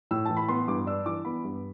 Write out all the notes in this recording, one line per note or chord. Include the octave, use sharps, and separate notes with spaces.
A2 E6
E3 A5
B5
B3 C6
G2 D6
D4 E6
E3 D6
B3 B5
G2